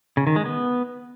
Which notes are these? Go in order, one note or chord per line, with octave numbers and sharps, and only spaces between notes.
C#3
D#3
G#3
B3